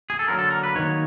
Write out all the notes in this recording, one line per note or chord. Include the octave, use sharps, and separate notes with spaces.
G#4
A4
D3 F#3 A#3 A#4
A4
A#4
B4
D#3 F#3 A#3 C#5